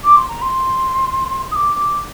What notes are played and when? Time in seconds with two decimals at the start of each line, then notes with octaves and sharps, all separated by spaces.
0.04 D6
0.16 C6
0.28 A#5
0.42 C6
1.51 D#6
1.55 D6
1.75 D6